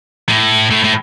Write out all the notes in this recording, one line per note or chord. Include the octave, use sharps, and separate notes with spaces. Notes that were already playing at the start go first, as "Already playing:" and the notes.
A2
A2
A2